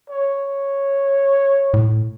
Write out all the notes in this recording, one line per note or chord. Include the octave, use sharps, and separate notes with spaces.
C#5
A2